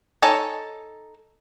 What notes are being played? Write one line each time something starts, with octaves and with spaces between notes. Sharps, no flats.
D#4 A4 C#5 G#5 A5